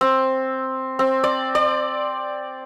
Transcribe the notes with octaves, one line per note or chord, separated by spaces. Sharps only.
C4
C4
D5
D5